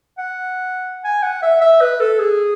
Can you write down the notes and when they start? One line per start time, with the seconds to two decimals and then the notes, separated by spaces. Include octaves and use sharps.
0.18 F#5
1.05 G#5
1.23 F#5
1.43 E5
1.61 E5
1.81 B4
2.00 A4
2.19 G#4